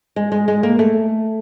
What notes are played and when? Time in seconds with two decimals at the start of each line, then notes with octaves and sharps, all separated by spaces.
0.16 G#3
0.32 G#3
0.48 G#3
0.63 A#3
0.79 A3